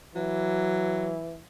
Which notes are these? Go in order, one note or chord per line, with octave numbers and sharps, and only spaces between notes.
E3 F#3